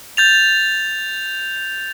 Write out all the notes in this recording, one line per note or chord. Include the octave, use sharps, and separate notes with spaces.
G6 A6 F7